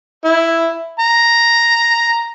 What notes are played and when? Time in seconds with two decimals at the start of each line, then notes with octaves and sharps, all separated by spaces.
0.24 E4
1.00 A#5